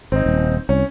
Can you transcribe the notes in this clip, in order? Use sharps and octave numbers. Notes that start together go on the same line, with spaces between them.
G#1 C4 D#4
D#1
C2 C#4